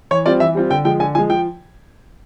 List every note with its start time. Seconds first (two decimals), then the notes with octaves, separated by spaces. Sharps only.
0.11 E3 C#5
0.26 G3 C4 F4 D5
0.40 E3 E5
0.55 G3 C4 F4
0.70 D3 G5
0.85 F3 G#3 G5
1.00 D3 G#5
1.15 F3 G#3 G#5
1.30 F3 G5